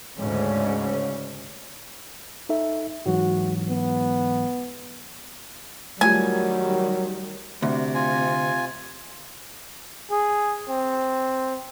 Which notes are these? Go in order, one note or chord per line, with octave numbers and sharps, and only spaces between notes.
D2 G#2 C#3 C#4
D#4 A4 E5
G#2 E3 F#3 F#4
B3
D#3 F#3 G3 A3 F4 G4 G#5
D2 C3
F4 G#5
G#4
C4